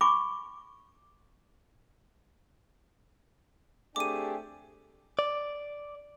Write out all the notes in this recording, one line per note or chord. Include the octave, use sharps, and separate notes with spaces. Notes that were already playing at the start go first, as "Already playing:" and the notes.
G#5 B5 C#6 D6
A3 C4 D4 G4 G#4 D6 D#7
D5